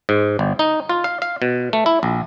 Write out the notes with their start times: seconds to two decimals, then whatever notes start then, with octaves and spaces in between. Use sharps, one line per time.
0.09 G#2
0.39 G1
0.59 D#4
0.89 F4
1.04 F5
1.22 F5
1.42 B2
1.73 A3
1.86 E4
2.03 A#1